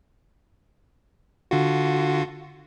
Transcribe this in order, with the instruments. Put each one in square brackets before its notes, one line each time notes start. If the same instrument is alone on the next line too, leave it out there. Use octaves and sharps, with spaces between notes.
[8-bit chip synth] D3 F4 F#4